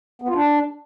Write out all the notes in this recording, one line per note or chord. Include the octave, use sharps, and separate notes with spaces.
B3
F4
D4